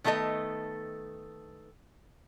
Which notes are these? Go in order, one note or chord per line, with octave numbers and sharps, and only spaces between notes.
D#3 A3 B3 A4 D#5